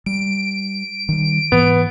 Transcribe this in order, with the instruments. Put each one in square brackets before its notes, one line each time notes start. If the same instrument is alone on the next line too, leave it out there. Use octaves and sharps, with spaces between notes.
[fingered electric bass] G3 [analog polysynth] D7
[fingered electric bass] D#3 G3
[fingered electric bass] G#2 E3 [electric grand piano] B3